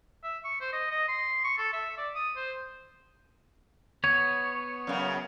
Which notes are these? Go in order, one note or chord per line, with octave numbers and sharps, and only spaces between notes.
E5
C#6
C5
D#5
D#5
C6
C#6
A4
E5
D5
D#6
C5
B3 C#5 G#6
F#2 C#3